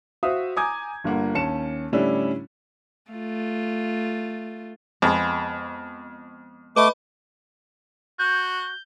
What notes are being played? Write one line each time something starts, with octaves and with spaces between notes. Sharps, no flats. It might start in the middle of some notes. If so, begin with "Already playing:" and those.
F#4 C5 E5 F5 D#6
G#5 A#5 D6 D#6 G6 G#6
G1 G2 A#3 F#5
D#2 C#4 A5 C#7 E7
A2 D3 G3 C#4 D4 E4
A3 F4
F2 G#3 B3
A3 B4 D#5 B5 D6
F#4 G6